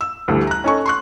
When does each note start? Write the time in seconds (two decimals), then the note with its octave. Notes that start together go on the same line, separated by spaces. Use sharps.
0.01 E6
0.28 D2 E3 G3
0.47 A#5 F#6
0.64 C#4 D#4 A4 G#5 C#6
0.86 C6 C#6 F#6